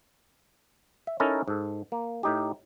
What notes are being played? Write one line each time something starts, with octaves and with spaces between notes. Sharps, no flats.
E5
C#4 D#4 E4 A4 A#4
G#2 A4
A#3
A2 D#4 G4